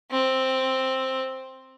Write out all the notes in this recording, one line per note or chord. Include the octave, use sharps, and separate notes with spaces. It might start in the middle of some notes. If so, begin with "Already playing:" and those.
C4